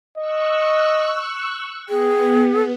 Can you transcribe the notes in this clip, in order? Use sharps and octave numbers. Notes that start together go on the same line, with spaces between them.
D#5 C#6 E6 F#6
B3 G#4 G5